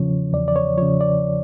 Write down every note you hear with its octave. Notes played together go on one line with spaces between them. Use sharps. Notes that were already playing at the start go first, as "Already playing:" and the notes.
Already playing: E2 C#3 F3 C#5
E2 D5
D5
C#5
C#3 F3 C#5
D5